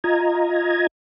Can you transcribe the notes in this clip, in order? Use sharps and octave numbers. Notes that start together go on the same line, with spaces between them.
F4 D#5 A#5 G#6